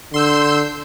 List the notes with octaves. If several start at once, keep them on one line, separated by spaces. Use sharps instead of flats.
D3 C6 E6 G6